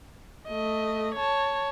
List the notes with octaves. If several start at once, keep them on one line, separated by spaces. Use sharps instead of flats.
A3 D#5
C#5 A5